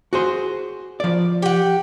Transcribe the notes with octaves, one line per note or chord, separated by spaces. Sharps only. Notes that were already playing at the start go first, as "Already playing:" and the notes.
F#4 G#4 C5
F3 D5
G4 F#5